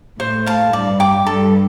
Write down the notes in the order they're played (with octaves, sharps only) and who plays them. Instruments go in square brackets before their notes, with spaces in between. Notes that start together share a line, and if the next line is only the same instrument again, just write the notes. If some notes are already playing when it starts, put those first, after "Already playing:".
[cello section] A2 [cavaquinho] C5
[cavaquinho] F5 A5
[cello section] G2 [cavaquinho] D5
[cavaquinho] G5 D6
[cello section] G2 [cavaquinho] A4